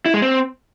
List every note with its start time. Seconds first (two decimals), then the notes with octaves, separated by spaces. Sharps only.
0.06 E4
0.14 G#3
0.22 C4